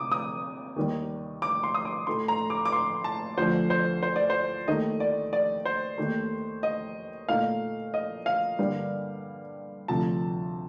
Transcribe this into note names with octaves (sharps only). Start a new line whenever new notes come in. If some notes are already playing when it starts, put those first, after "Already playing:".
Already playing: C3 D6 D#6
D#6
D#2 D#3 G3
D6
C6
D#6
D6
A2 A3 D#4 C6
A#5
D6
D6
C6
A5
D2 D3 F3 A3 C5
C5
C5
D5
C5
D#2 D#3 A3 D#4 D#5
D5
D5
C5
D#2 D#3 A3
D#5
A#2 A3 D#4 F5
D#5
F5
G2 D3 G3 A#3 D4
D2 C3 F3 A5